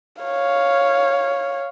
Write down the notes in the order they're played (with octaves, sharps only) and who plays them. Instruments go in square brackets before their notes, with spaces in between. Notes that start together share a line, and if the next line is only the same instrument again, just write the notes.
[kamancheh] C#5 F5